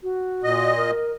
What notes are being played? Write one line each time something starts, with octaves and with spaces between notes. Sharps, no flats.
F#4
A#2 D#5
A#4